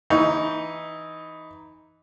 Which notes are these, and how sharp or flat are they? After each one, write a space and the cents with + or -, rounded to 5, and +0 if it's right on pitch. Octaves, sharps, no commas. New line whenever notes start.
E3 +0 D#4 +10 C#6 +20